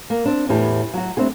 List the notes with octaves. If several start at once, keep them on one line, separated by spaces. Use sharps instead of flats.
A#3
C4 D4
E2 A2 E3 G4 A5
F#3 F#4
G3 A3 C4 D4 G#4